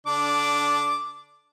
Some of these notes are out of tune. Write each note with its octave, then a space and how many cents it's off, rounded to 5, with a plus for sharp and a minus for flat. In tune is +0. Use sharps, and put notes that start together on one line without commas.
D3 -25 D4 -10 D6 +0